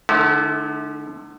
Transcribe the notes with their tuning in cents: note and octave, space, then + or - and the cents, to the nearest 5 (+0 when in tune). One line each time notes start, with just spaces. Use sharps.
D3 +25 A3 -35 E4 -40